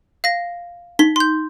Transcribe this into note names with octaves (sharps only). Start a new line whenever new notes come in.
F5 A#6
D#4 B6 G7
C6 G6